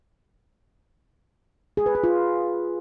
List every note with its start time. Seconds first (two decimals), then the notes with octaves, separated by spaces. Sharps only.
1.77 G#4
1.86 B4
1.95 G#4
2.04 F4